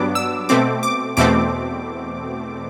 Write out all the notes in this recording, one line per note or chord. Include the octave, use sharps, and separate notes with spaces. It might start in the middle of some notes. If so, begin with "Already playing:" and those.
Already playing: G2 F#3 B3 D4 D6
E6
B2 A3 C4 D6
D6
E2 B2 A3 C4 D6